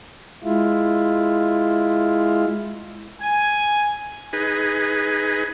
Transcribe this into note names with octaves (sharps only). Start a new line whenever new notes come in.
G#3 E4 F4
G#5
D#4 G#4 B4